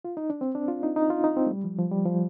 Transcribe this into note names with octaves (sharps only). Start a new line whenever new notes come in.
F4
D#4
D4
C4
D4
F4
D#4
D#4
F4
D#4
C4
A3
G3
F3
F3
G3
F3